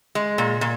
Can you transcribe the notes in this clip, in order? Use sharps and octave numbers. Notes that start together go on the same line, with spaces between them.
G#3
A#2
A#2